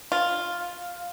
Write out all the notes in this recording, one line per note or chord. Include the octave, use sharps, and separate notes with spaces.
F4